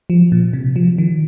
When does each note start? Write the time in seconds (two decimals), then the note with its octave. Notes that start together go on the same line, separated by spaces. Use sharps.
0.10 F3
0.32 A#2
0.53 C3
0.76 F3
0.98 D#3